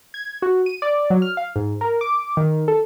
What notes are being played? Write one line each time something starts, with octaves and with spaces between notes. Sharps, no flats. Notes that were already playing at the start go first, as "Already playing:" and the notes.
G#6
F#4
D#7
D5
F#3
F6
F5
G#2
A#4
D6
D#3
A4